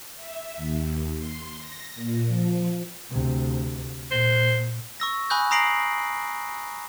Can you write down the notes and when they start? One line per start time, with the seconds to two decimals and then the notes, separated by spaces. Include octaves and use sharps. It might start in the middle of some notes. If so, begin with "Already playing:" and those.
0.16 E5
0.57 D#2
1.16 C6
1.57 A#6
1.95 A#2
2.28 F3
3.10 D2 C3
4.11 A#2 C5
5.00 C#6 E6 A#6
5.30 G#5 B5 C#6 D#6 F#6 G6
5.51 A#5 D#6 A#6 C7 D7 F#7